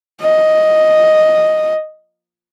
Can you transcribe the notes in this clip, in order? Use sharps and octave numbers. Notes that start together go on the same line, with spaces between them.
D#5